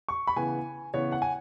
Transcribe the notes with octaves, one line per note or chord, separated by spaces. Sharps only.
C#6
B5
C#3 E3 B3 G#5
C#3 E3 B3 C#5
F#5
G#5